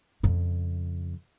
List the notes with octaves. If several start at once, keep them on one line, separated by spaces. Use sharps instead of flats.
F2 C#3